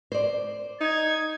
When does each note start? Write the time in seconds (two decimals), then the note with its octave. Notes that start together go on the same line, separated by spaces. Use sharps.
0.12 C5 D5
0.81 D#4 G#6